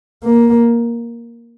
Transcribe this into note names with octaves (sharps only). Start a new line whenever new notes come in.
A#3